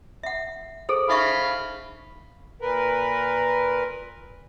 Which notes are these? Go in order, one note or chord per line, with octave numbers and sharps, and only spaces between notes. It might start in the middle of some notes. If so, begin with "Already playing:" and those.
E5 F#5
G#4 A4 C5
D#4 E5 F5 B5 C#6
A#2 A#4 B4